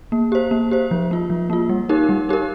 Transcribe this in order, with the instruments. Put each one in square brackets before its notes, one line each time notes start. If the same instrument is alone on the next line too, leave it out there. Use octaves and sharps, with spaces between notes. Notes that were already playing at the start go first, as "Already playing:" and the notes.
[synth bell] A#3
G4 C5
A#3
G4 C5
F3
A#3 F4
F3
A#3 F4
G3
D#4 G4 A#4
G3
D#4 G4 A#4